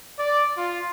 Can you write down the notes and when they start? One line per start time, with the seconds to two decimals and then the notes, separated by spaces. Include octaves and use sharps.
0.18 D5
0.57 F4